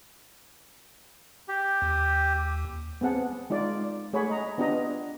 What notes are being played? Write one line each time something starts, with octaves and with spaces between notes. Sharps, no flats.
G4
D#2
B3 C4 G#4 F#5 A5
G#3 D#4 F4 D5
A3 G#4 C#5 F#5 B5
D#5 A#5
B3 D4 F4 G4 D#5 A#5